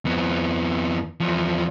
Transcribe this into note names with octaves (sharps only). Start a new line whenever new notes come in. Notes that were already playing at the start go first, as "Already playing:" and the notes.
F2 B3
E2 F3